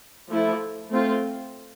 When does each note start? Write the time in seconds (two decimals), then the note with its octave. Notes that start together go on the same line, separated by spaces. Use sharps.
0.29 F3 A3 E4
0.90 A3 C4 F4